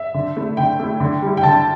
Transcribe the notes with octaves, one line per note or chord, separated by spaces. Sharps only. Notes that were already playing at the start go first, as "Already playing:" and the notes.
Already playing: E5
D3
A3 E4
D3 G5
A3 E4
D3
G3 E4
G5
D3 A5